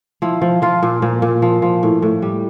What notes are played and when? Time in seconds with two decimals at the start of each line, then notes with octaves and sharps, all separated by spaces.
0.22 F3 E4
0.42 F3
0.62 F3 F4
0.83 A#2
1.02 A#2
1.22 A#2
1.42 F3
1.62 F3
1.83 A2
2.02 A2
2.22 G3